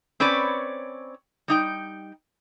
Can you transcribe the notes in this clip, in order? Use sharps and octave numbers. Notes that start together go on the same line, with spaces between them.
C4 C#4 B4 C#5 D5
G3 D#4 G5